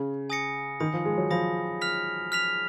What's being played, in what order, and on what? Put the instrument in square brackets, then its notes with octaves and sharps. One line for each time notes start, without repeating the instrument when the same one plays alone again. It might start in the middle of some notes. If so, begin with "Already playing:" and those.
Already playing: [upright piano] C#3
[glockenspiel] G#5 D#6 A#6 C#7
[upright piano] D#3 [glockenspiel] B5 D#6 A#6
[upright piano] F3
G#3
F#3
[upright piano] F3 [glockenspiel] B5 D#6 A#6
[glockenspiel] F6 B6 F7
F6 B6 F7